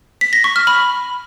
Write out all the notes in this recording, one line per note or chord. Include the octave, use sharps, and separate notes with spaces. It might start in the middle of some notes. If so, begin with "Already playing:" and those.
B6
A#6
C#6
F6
B5